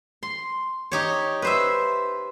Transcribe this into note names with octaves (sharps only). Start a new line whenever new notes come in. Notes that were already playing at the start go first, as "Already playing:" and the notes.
C6
D#4 G4 C#5
B4 C5 E5